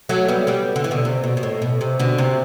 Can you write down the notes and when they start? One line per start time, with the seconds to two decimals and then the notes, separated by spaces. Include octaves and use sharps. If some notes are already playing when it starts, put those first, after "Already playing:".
0.09 F#3 A3
0.28 G3 B3
0.47 G3 B3
0.76 D3
0.84 E3
0.91 B2 D3
1.05 C3
1.24 B2
1.37 B2
1.43 A2
1.62 B2
1.81 C3
1.99 B2 D3
2.18 C3